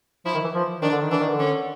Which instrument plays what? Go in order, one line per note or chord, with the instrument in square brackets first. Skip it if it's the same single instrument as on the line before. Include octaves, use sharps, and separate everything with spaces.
[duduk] F3 [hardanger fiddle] E4
[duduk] D#3
E3
F3
[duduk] D#3 [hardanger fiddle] D4
[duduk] D3
D#3
[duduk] E3 [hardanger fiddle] D4
[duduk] D#3
D3
[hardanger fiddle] C#4